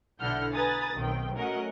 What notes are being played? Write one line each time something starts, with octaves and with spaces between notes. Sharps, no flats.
B1 D3 E4 F#5 F6 G6
B4 G#5 A#5 D#6 A6
B1 D#3 C4 G5
F#3 A3 C#4 A#4 D#5 F#5